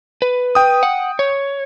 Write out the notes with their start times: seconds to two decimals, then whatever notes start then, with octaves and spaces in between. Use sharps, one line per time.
0.22 B4
0.55 G5 D#6
0.83 F#5
1.19 C#5